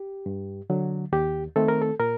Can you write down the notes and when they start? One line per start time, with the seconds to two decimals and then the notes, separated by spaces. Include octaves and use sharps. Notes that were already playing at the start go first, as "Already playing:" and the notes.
Already playing: G4
0.26 G2
0.70 D3 F#3
1.12 D#2 G4
1.56 D#3 A3 C4 A4
1.68 A#4
1.82 A4
2.00 A#2 A#4